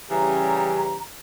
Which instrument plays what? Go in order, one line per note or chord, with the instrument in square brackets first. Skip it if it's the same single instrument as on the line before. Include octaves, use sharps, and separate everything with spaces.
[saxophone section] C#3 E3 [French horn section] G3 C#4 G4 [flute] G#5 [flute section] A#5